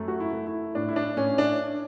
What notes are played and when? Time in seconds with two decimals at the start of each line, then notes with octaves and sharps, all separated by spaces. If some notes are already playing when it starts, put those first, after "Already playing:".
Already playing: F#2 A3
0.08 F#4
0.20 E4
0.33 A3
0.47 E4
0.75 A2 D4
0.89 E4
0.96 D4
1.17 A2 C#4
1.38 D4